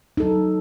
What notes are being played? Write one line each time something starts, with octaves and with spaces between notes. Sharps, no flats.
F#3 D#4 A4